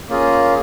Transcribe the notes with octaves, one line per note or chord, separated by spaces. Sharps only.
A#3 C#4 F4 G#4